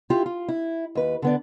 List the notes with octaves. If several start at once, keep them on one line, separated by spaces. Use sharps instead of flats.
E4 F4 G4
F4
E4
D#2 B4
D3 B3 D5